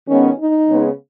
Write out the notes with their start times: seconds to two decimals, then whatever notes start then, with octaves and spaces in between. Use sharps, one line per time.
0.08 D#3 G#3 B3 C#4
0.39 D#4
0.69 C#3 G#3 B3